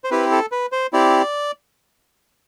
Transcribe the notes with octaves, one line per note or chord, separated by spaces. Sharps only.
C5
C4 E4 G4 B4
A4
B4
C5
C4 E4 G4 D5